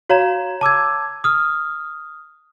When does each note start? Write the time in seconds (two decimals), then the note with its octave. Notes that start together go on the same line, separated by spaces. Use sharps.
0.09 F#4 C#5 F5 A#5 G#6 E7
0.61 A5 D6 E6 G#6
1.24 D#6 F6